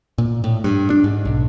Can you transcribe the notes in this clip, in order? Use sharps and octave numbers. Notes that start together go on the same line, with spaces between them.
A#2
A2
G2
D4
G#2
B1